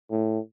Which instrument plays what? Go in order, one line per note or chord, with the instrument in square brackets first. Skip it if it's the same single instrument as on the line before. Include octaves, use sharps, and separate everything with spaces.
[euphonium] A2